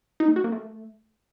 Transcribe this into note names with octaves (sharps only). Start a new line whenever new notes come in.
D#4
A3
F#4
A#3
A3